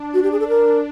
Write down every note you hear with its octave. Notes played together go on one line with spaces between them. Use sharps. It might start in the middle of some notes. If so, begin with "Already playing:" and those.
Already playing: D4
F#4
G4
G#4
A4
A#4